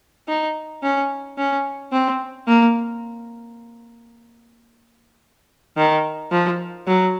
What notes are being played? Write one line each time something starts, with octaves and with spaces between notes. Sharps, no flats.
D#4
C#4
C#4
C4
A#3
D#3
F3
F#3